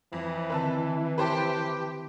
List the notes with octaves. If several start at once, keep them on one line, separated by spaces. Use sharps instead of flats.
F2 E3
D3 D#3 C4 B4 E5 A5
G4 B4 C5 A5